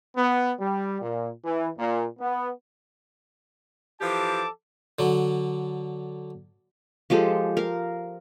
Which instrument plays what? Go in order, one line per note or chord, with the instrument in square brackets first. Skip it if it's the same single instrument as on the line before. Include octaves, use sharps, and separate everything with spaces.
[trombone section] B3
G3
A#2
E3
A#2
B3
[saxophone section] E3 F3 G4 [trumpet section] A4 A5 D6
[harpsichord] D3 F#3
[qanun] F3 G#3 G4 A4
A#4 F5